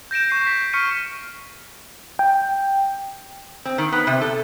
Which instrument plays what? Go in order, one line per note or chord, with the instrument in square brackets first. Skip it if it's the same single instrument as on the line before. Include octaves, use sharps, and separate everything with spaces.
[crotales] G6 A#6 D7 E7
C#6 C7
B6
C#6 F6 B6 C#7 D#7
[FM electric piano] G5
[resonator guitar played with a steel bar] C4
D#3
B3
C3
A4